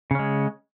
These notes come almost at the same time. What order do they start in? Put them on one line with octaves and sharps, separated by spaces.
C#3 C#4 G#3